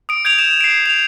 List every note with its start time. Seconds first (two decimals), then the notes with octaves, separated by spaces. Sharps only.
0.09 D#6 D7
0.25 G6 G#6 D7 F7
0.39 E7
0.61 C7 D7
0.86 F7